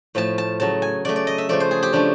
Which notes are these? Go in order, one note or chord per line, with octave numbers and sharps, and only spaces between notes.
A2 F3 A3 A5
A5
C#3 F#3 A3 A5
G#5
C#3 F#3 A3 D5
D5
D#5
E5
C#3 F3 A3 D5
C5
G#4
G4
C#3 F3 A3 D4